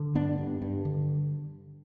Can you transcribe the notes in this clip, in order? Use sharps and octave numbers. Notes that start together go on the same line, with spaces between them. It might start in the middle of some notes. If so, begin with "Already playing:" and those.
Already playing: D3
G2 B3 D4
G2
G2
D3